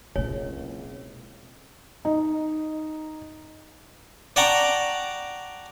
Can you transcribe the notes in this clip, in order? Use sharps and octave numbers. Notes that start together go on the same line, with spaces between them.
F#1 C#2 B2 C4 C#5
D#4
D5 F#5 G5 A5 A#5 C#6